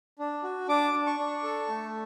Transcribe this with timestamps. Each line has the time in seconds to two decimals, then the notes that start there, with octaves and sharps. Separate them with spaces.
0.19 D4
0.43 F#4
0.68 D4 D6
0.94 D4
1.06 C#6
1.19 D4
1.43 A4
1.68 A3